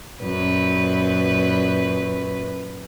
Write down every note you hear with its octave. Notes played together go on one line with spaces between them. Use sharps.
F#2 A#2 B4